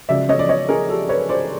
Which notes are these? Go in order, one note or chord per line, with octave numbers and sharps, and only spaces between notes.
C#2 C#3 F#3 D5 E5
C#5 D#5
D5
C#5 D#5
G#4 A#4
G4 A4
B4 C#5
C5 D5